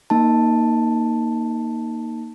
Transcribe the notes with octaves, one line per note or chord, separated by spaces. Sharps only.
A#3 D#4 A5